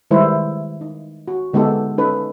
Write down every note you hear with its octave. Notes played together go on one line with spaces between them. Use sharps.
D#3 G3 G#3 E4 B4 C5
D#4
F#4
D3 G#3 B3 D#4 G4 A4
C#4 D#4 A4 B4